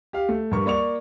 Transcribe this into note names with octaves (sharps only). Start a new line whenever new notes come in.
G4 F5
A3
G2 A#4 C#6
A#3 D5 C#6 F7